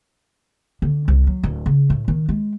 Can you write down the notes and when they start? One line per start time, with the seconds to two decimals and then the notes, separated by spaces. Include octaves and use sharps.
0.82 D3
1.08 C2
1.27 F#3
1.43 D1
1.66 C#3
1.90 A2
2.08 D#3
2.29 G#3